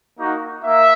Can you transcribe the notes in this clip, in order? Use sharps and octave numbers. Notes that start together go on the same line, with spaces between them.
A#3 D#4 F#4
A#3 E5